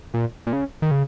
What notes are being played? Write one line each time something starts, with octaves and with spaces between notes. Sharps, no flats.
A#2
A#2
C#3
D#3
C#3